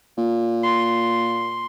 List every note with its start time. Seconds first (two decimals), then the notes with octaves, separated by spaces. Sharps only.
0.18 A#2
0.63 C6